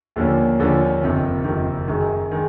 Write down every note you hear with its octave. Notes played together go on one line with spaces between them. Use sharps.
D#2 D3 F3 A#3 C#4
D#2 D3 F3 A#3 C#4
F#1 F2 C3 D#3
F#1 F2 C3 D#3
F#2 D#3 G#3
D#3 G#3